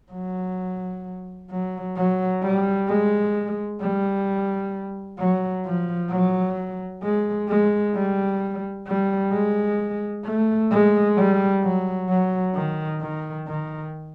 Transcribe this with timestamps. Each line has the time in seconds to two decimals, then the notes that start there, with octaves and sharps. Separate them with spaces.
0.13 F#3
1.50 F#3
1.97 F#3
2.43 G3
2.89 G#3
3.81 G3
5.18 F#3
5.65 F3
6.10 F#3
7.03 G#3
7.49 G#3
7.95 G3
8.87 G3
9.33 G#3
10.25 A3
10.71 G#3
11.17 G3
11.63 F#3
12.09 F#3
12.55 D#3
13.02 D#3
13.47 D#3